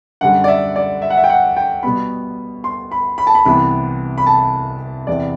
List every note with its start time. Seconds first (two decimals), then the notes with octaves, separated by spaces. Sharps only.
0.21 F#2 D3 G3 F#5
0.44 D5
0.48 E5
0.76 D5
1.02 E5
1.10 F#5
1.17 E5
1.24 G5
1.29 F#5
1.57 G5
1.83 B2 G3 B3 B5
2.64 C6
2.91 B5
3.18 B5
3.27 A5
3.35 B5
3.45 C2 C3 E3 B3 B5
4.18 B5
4.26 A5
5.07 E2 C3 E3 B3 D5